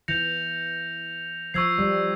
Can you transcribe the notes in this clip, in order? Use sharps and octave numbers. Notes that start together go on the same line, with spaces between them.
E3 G6 A#6 C#7 F7
F3 C#6 E6 G#6 C7
G3